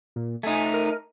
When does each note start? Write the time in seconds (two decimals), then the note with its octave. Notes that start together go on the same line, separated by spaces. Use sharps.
0.16 A#2
0.43 A3 D#4 G#5
0.74 A#4